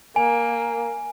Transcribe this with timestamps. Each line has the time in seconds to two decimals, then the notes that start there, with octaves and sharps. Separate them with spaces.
0.16 A#3 G#5